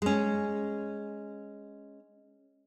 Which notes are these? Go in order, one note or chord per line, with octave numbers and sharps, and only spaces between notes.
G#3 C#4